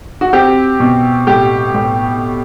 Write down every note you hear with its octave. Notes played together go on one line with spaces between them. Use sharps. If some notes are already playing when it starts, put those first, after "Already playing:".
F#4
C4 G4
B2
A2 G4
A2